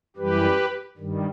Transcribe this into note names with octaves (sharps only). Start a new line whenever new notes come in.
F#2 E3 G3 G4 B4
G2 D#3 G3